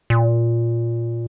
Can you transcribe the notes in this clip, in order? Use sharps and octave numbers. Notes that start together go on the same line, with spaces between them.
A#2